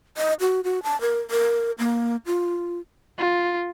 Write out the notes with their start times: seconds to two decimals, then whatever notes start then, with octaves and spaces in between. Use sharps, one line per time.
0.17 D#5
0.41 F#4
0.64 F#4
0.83 A5
1.01 A#4
1.31 A#4
1.79 A#3
2.26 F4
3.18 F4